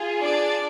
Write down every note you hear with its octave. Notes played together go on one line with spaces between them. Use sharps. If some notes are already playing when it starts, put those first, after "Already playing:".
Already playing: F4 G#4
D4 D5